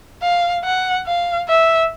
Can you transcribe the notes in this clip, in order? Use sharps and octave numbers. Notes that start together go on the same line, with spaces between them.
F5
F#5
F5
E5